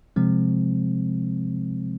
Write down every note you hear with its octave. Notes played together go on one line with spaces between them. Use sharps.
C3 F3 G#3 C4